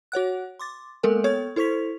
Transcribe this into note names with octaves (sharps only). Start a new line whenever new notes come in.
F#4 C#5 F#5 F#6
C6 D6 A6
G#3 A#3 B3 A4 A#4 G#5
B3 A4 C#5 C#6 G#6
E4 A4 C5 C#6 B6 F7